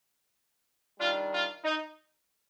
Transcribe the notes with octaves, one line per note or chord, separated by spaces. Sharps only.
D#3 G3 D4 F4
F4
D#4